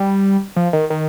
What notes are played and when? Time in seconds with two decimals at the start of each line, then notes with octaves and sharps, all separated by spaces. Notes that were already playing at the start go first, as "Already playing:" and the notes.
Already playing: G3
0.56 F3
0.73 D#3
0.90 D#3